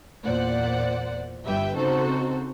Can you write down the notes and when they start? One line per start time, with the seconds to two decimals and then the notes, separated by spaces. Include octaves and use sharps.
0.24 E2 A#2 C5 D5 F#5
1.44 G1 G2 G4 B4 E5 G5
1.76 C#3 C4 D#4 F#4 A4 C5